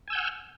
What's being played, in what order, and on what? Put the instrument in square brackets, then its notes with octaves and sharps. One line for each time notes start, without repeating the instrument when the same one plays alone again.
[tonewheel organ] G#5
E6
G6
F#5
F6